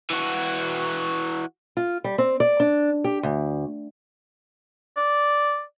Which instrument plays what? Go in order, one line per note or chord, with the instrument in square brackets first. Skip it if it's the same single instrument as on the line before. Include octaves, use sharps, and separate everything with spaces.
[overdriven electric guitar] E3 F#4
[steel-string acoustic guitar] F4
G3
C4
D5
D4
G4
D2
[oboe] D5